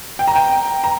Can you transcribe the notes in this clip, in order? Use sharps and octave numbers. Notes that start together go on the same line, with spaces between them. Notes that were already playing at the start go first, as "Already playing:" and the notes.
G5
A#5
G5
A#5